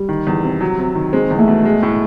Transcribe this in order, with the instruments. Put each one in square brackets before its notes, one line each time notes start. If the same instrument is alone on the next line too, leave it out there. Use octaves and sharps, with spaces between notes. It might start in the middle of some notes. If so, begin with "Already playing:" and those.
Already playing: [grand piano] G3
[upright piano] D#3
E2
C3
F#3
C3
D#3
[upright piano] G#3 [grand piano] C4
[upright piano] E2
[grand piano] A3
[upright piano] B2
G#3
A2